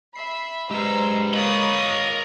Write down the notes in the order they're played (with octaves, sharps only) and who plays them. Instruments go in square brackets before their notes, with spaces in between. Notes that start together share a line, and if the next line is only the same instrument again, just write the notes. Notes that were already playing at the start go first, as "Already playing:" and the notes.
[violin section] E5 B5 [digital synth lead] C7
[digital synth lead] G#3 [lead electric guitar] G4 B4 [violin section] C5 A#5 E6
[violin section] A#3 C#6 D#6 [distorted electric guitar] A#4 B5 [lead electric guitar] C#5 D#5